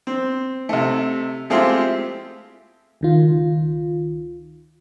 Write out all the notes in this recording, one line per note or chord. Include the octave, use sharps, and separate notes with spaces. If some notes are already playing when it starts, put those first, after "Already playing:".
C4
C3 A3
G#3 A3 C4 E4 F4 G4
C#2 D#3 F4